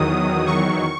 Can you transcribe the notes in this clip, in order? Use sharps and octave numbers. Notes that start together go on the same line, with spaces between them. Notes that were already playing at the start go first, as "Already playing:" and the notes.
Already playing: E2 D#3 F#3 D#6
C#6